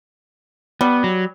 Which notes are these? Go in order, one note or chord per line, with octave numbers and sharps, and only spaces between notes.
G3 B3
F#3